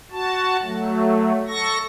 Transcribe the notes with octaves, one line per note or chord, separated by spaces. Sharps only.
F#4 A5
F#3 A3
A4 C#6 A#6